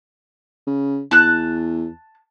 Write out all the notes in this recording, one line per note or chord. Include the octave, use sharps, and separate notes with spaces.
C#3
E2 A5 F#6